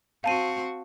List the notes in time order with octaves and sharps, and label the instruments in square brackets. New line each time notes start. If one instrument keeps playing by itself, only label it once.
[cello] C4 F#4 [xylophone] F5 A5 D#7